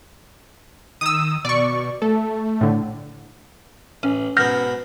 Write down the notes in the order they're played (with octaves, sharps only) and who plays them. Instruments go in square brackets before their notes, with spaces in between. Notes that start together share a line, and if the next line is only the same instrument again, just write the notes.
[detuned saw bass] D#3 [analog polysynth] D#6 E6
[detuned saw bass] B2 [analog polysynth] D5 C#6
[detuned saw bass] A3 [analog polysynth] A4
[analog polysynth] A2 D3
[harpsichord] A1 [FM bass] C#4
[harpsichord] G#2 B2 B3 [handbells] F6 G6 A#6